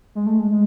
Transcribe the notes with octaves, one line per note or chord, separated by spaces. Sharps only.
G#3
A3
G#3
G#3